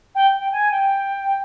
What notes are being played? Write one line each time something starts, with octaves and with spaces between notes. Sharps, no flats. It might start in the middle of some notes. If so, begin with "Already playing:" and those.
G5
G5
G#5
G5